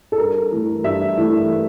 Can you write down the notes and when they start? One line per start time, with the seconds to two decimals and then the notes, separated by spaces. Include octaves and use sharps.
0.12 A4
0.18 G2 A#4
0.52 E3 A3
0.84 G2 E5
1.17 E3 A3